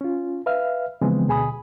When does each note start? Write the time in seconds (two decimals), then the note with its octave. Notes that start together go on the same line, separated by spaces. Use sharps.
0.01 C#4 F4
0.46 B4 E5 F5 F6
1.02 C#3 E3 F3 G#3 B3 C4
1.27 D2 B2 G#4 G#5 B5 D#6